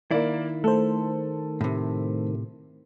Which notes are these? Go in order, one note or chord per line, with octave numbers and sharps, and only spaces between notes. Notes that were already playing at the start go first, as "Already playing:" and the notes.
D#3 A#3 E4 D5
A3 A4 C5
A2 C3